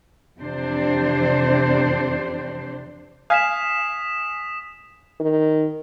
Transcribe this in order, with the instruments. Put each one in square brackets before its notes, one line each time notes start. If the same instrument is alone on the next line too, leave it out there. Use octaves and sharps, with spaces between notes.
[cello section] F2 C3 E3 D4 C5
[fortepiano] F5 G#5 [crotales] D#6 B6 E7
[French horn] D#3